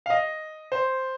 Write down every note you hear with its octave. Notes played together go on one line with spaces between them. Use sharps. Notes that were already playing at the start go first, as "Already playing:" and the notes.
F5
D#5
C5